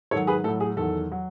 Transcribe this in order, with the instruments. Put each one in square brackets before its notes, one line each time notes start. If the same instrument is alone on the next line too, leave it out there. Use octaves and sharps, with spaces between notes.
[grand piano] G#2 D#3 F#3 A4 C#5
G#4 B4
A2 A4
F#3
G#4
E2 D#3 F#3 A4
F#3